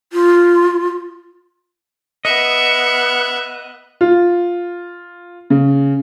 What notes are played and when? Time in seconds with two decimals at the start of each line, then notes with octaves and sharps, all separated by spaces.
0.13 F4
2.25 B3 D#5 E5 F#6 C#7
4.01 F4
5.50 C#3